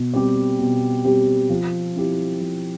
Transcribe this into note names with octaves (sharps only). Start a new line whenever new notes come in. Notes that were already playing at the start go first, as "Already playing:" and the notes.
Already playing: B2
G3 C4 G4
B2
G3 C4 G4
F3
C4 E4 G4
F3